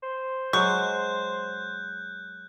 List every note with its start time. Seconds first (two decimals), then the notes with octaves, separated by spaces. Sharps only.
0.03 C5
0.53 F#3 G#3 F#4 C#6 F#6 G6